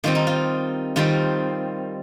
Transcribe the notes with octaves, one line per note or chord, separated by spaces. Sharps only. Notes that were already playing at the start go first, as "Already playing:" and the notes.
D#3 G3 C4 F4
D#4
F4
D#3 G3 C4 F4